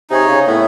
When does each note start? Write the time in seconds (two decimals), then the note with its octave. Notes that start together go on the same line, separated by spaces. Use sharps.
0.10 C3 D#4 G#4 C#5
0.28 C#3
0.47 A2 B3